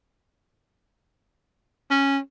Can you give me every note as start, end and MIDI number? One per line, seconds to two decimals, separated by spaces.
1.91 2.18 61